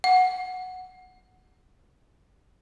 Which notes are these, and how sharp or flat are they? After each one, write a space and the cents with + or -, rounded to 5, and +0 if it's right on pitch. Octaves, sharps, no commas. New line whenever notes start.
F#5 -5